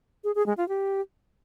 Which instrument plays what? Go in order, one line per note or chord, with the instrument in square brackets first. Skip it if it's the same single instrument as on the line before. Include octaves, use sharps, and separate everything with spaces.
[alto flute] G#4
G#4
G#3
F4
G4